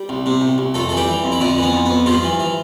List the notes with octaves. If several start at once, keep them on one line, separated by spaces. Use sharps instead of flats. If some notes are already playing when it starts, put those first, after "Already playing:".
Already playing: G3 G4
C2
C3
C2
C2
F2 A3 A4
A4
E3
G3 G4
E3
F2
E4
F2 D3 D4
E3 B3
F2
F2 B3
G2 F3 F4
E3
E3